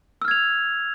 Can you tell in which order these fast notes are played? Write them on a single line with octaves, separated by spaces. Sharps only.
E6 F6 G#6 F7